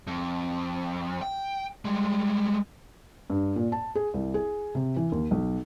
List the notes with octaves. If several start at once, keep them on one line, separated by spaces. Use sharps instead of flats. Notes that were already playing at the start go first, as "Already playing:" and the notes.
F2
G5
G3 G#3
G2
A#2
A5
G#4
C2
G#4
C3
E3
D#2
B1